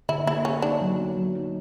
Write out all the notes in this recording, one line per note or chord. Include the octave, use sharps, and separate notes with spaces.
D3 E4
A#3 E4
D3 C#4
D4 D#4
F#3
B3
F#3
D#4